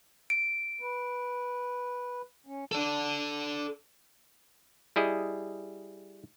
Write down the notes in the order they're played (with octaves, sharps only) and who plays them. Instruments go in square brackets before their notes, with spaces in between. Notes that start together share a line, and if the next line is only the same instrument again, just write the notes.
[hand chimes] D7
[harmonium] B4
C#4
[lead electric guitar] A4 D5
[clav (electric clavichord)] G3 E4 G#4 D#5